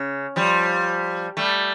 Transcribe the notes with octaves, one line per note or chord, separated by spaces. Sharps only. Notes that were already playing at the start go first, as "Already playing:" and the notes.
Already playing: C#3
F3 G3
G3 A3